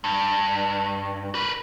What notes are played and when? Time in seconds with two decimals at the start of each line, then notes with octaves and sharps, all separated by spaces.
0.04 G2
1.35 A#4 B4